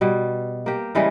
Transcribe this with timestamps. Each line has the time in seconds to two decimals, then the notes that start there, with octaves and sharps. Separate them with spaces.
0.01 B2 G3
0.66 A#3 G4
0.95 C#3 E3 G3 G#3